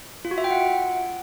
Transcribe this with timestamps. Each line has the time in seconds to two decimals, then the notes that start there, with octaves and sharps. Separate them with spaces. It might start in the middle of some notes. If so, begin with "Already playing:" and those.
0.25 F4
0.31 F#4
0.38 E5
0.44 G5
0.51 F#5